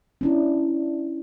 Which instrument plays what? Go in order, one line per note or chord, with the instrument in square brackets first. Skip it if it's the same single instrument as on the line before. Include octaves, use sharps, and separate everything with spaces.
[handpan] C#4 D4 E4